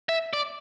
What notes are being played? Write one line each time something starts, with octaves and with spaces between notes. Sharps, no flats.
E5
D5